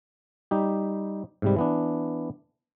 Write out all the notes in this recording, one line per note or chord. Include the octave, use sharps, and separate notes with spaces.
G3 D#4 G4
G#2 C3 G3
E3 B3 D4